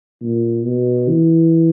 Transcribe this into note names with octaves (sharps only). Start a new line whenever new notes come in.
A#2
B2
E3